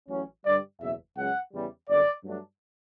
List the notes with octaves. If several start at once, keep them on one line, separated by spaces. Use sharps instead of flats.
A1 A2 F#3 C#4
G2 D3 G3 D5
F#1 E2 B2 E5
C#2 C#3 F#3 C#4 F#5
E2 C#3 E3 G3
G1 F#2 D3 D5
G2 F#3 A3 D4